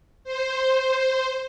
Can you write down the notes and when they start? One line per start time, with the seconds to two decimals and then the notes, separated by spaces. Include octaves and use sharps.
0.24 C5